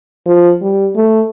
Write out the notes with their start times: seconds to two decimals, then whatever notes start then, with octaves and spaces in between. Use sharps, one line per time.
0.26 F3
0.61 G3
0.96 A3